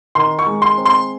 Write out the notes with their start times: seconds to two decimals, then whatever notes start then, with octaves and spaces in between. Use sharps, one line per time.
0.15 D#3 C6
0.39 C#6
0.46 G#3
0.62 C6
0.78 C4
0.85 C6